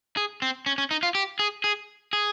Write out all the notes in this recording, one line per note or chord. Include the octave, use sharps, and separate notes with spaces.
G#4
C4
C#4
C#4
D#4
F4
G4
G#4
G#4
G#4